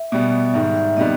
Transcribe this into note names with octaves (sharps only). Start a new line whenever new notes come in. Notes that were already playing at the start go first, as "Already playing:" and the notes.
Already playing: E5
B2 G3 B3
G#2 D#3 G3 E5
E5
C3 D#3 G3 B3 D#5